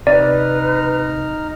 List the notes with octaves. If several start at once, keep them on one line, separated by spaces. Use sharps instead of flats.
C3 D#4 B4 D5 A#5 F6